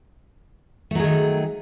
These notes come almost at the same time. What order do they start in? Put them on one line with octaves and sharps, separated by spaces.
A3 F#3 G#4 D#3